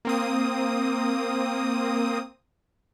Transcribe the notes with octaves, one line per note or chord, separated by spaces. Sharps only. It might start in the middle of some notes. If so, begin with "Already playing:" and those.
A#3 C4 D#6